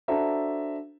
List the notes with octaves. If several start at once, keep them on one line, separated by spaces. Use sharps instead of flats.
D4 F#4 A4 C5 E5 A#5